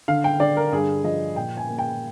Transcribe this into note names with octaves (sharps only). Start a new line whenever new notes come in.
D3 F5
G5
D3 D5
A#4
G2 G#4
F3 D#5
A#2 G5
G#5
A#3
G5